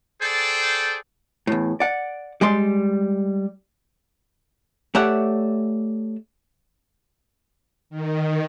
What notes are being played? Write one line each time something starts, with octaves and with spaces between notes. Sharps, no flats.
G#4 A4 C5 D5 G5
E2 A2
D5 F#5
G3 G#3 D5 C6
A3 G4 C#5 D5 E5 F#5
D#3